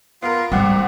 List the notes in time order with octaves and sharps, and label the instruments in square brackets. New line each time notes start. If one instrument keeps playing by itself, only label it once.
[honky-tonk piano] B3 A#4 [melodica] F4 F5
[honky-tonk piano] C2 F#5 D6 [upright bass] G#2 G3 [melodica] C4